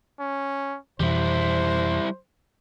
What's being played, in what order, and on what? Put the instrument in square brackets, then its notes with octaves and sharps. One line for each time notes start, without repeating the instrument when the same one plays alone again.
[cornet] C#4
[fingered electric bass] F2 B2 E3 [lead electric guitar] G3 E4 [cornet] C5